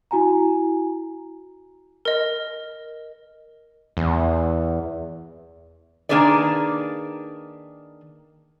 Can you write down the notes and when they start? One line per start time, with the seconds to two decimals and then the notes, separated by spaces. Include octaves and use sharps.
0.11 E4 F#4 G#5 A#5
2.05 A#4 D#5
3.97 E2
6.09 D#3 A#3 D4 G#4 B4 D5